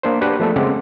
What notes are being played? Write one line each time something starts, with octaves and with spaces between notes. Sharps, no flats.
A#3 D4 C5
D4 F#4 G4 B4 F#5
F3 A3 B3 G#4 A4
C#3 G#3 A#3 C4 F#5 D6